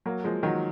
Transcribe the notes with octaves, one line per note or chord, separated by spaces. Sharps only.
F#3 A#3
F3 G#3
D#3 F#3